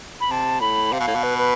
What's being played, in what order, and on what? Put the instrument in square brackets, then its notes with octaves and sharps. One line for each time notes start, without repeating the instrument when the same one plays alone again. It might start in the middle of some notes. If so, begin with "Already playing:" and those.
[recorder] B5
[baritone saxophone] C3 [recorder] A5
[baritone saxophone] A2 [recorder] B5
[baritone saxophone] C3 [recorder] F5
[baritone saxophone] B2
A2
B2
[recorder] B4
B4